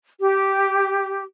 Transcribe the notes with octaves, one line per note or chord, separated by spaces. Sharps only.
G4